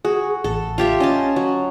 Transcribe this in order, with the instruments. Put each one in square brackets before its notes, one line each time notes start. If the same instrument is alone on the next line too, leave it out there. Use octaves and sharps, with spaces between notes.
[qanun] F#4 [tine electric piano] G#4
[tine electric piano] A1 [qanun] A4
[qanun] F4 G4 E5
[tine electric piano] C#4 [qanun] D#5 G#5 A5
[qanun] F#3